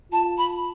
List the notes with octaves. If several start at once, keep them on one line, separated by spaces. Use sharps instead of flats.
F4 A5
B5